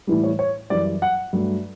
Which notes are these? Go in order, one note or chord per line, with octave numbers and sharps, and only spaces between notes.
A2 E3 G3
C#5
C#5
F#2 E3 G3 D5
F#5
G2 F#3 A3